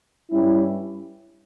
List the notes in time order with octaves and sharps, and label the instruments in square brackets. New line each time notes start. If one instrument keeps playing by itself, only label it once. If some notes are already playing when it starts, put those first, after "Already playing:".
[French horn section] G2 G3 C#4 E4